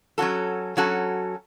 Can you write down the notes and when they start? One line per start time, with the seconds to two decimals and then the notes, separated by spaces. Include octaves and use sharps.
0.18 F#3 C#4 F#4 A4
0.77 F#3 C#4 F#4 A4